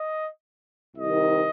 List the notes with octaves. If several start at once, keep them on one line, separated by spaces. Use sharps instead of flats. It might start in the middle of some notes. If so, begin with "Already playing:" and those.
Already playing: D#5
C2 C3 D#3 D#5